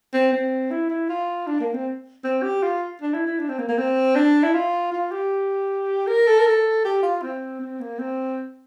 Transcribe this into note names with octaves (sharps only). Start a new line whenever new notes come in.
C4
C4
E4
E4
F4
D4
A#3
C4
C4
G4
F4
D4
E4
E4
D4
C4
A#3
A#3
C4
D4
E4
F4
F4
G4
A#4
A4
A#4
A4
G4
F4
C4
C4
A#3
C4